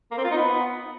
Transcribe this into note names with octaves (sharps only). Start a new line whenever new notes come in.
A#3
C4
F4
D#4
B3